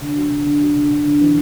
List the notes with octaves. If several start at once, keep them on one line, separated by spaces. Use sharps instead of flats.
D3
F#3
D3
D3
F#3
D3
D3
D3
E3